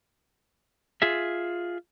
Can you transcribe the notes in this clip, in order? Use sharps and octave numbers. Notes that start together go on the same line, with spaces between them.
F4 G#4 E5